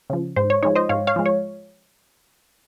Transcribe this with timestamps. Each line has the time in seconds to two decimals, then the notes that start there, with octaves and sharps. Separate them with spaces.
0.10 C#3 F3
0.36 G#2 C5
0.50 C#5
0.63 F3 G#3 D#4 C#5
0.75 C5 D#5
0.89 G#2 C#5 F5
1.07 C#5 F5
1.16 F3 G#3
1.26 C#5